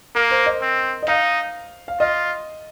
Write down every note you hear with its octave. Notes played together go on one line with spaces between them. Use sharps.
A#3 A#4
C5
D#5
C4
D#5
D#4 F5
F5
F4 D#5